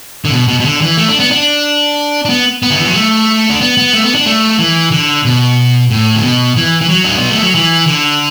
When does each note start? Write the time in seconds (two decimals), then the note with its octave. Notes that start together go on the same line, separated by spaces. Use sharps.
0.25 D3
0.32 B2
0.48 B2
0.60 B2
0.64 D3
0.81 E3
0.97 A3
1.09 D4
1.20 B3
1.31 D4
2.25 D4
2.30 B3
2.63 B3
2.70 D3
2.79 E3
2.87 F#3
2.95 A3
3.49 D4
3.61 B3
3.77 B3
3.93 A3
4.04 B3
4.15 D4
4.26 A3
4.59 E3
4.91 D3
5.25 B2
5.91 A2
6.16 D3
6.23 B2
6.57 E3
6.81 E3
6.89 F#3
7.04 D4
7.17 B3
7.30 A3
7.42 F#3
7.55 E3
7.87 D3